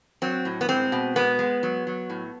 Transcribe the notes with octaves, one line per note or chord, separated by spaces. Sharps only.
F#3 C4
A2
B3
G#3 C4
B2
G#3 B3
G#3
F#3
F#3
A2